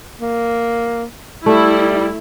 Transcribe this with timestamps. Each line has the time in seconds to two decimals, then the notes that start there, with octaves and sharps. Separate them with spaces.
0.19 A#3
1.46 G3 A3 E4